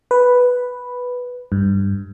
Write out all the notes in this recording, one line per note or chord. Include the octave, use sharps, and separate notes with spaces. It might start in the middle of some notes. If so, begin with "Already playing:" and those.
B4
G2